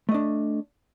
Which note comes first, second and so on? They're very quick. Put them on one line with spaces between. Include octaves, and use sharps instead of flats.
A3 D#5 D4